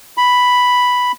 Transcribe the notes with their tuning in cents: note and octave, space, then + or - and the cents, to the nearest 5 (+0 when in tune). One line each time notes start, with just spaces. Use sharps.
B5 +0